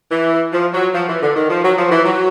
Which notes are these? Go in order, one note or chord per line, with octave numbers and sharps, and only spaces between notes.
E3
F3
F#3
F3
E3
D3
D#3
F3
F#3
F3
E3
F#3